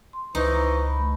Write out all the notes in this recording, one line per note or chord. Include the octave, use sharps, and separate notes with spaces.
C6
C#2 E3 D#4 C5 D#5 C#6
B5
A3